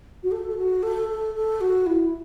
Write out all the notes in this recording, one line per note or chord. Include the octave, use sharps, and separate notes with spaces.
F#4
A4
A4
F#4
A4
A4
A4
F#4
E4